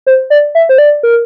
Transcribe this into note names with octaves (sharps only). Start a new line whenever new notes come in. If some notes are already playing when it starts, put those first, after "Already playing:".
C5
D5
E5
C5
D5
A#4